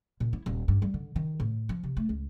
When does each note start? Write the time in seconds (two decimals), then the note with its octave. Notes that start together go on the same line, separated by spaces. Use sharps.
0.20 A#2
0.33 E4
0.46 D#1
0.68 G2
0.82 G3
0.94 D3
1.16 D#3
1.40 A2
1.69 F3
1.84 C3
1.97 A3
2.09 C#2